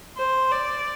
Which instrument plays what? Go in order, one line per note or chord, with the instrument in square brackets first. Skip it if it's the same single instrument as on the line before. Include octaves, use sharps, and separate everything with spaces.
[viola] C5
D5